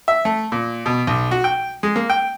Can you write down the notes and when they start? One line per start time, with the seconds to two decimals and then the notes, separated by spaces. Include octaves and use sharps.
0.08 E5
0.25 A3
0.52 A#2
0.86 B2
1.07 B1
1.31 F#4
1.44 G5
1.83 G#3
1.96 A#3
2.10 G5